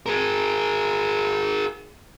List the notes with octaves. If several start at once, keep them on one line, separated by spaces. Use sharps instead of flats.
G#4 A#4